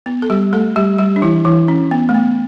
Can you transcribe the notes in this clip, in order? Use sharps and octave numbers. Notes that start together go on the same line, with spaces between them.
B3
A4
G3 G4
A3 A4
G3 G4
G3 G4
D4
E3 E4
E3 E4
C#4
B3
A3
B3